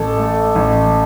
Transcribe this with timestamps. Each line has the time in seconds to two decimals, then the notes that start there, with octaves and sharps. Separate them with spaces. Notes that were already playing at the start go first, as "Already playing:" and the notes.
Already playing: A1 A4
0.18 A3
0.55 A1